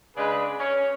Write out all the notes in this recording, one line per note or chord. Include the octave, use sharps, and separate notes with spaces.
C#3 G#3 D4 G#4 B4
C#4